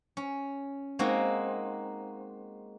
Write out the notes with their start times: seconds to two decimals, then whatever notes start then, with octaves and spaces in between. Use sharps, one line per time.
0.17 C#4
0.99 G#3 A#3 C4 D#4 F#4